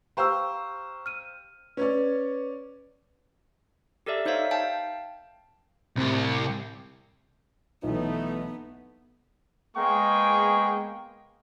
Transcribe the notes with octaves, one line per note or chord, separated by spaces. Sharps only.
G4 C5 F5 A#5 C#6 E6
F6 D#7
C#4 B4 C#5 D5
G4 A4 A#4 D5 E5
D#4 C5 C#5 E5 F5
F5 G5 A5
C2 A2 C4 G4 G6
B1 E3 A3 B3 D#4
G#3 A#3 B3 G#4 G5 C#6